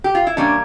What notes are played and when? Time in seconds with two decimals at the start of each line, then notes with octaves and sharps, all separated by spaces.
0.04 G4
0.15 F4
0.27 E4
0.37 E3 G3 A#3 C#4 D4